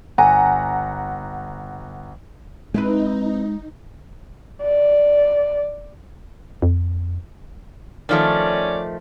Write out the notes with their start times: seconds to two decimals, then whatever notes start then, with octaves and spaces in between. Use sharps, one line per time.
0.18 G1 F#5 G#5 A#5
2.74 G#3 C4 D#4 E4 B4
4.62 D5
6.62 F2
8.09 D#3 F3 A3 C#4 D5